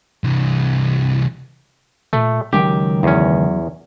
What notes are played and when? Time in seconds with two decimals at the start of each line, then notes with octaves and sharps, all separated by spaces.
0.24 C2 E3
2.13 A#2 A3
2.53 C#2 D#3 F#3 G4 G5
3.03 E2 C#4